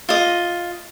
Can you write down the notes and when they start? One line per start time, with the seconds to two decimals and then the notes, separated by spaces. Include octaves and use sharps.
0.09 F4 D#5